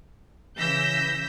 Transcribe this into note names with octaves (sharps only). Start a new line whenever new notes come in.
C#3 E3 E6 G6 A#6 B6